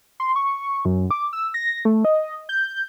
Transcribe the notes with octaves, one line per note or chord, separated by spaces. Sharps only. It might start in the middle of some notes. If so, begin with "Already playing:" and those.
C6
C#6
F#2
D6
E6
A#6
A3
D#5
G6